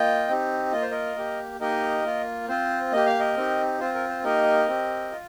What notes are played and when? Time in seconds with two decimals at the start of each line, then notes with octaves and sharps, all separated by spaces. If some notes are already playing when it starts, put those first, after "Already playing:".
Already playing: A#3 F4 D#5 G5
0.28 C4 D#4 G4
0.72 A#3 F4 D#5
0.82 C5
0.91 A#4 D#5
1.16 A#3 G4
1.60 A#3 D#4 G4 A#4 D#5
2.04 A#3 F4
2.48 C4 F4 C5
2.92 A#3 G4 D#5
3.06 F5
3.19 A#4 D#5
3.36 C4 D#4 G4
3.80 C4 F4 C5
3.95 A#4
4.09 C5
4.24 A#3 D#4 G4 A#4 D#5
4.68 C4 G4
5.12 F4